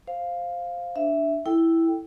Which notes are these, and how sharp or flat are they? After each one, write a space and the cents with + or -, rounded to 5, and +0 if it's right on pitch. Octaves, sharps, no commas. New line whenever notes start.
C5 +0 F5 +0
D4 +0 E5 +0
E4 +0 A4 +0 G5 +0